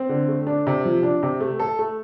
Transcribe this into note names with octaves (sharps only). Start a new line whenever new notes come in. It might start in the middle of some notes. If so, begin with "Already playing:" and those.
Already playing: C4
D3
A3
D4
C3
F3
D4
C3
A3
A4
A3